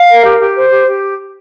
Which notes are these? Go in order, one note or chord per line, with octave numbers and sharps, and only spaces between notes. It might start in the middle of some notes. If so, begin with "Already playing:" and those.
Already playing: F5
A#4
G4
G4
C5
G4
G4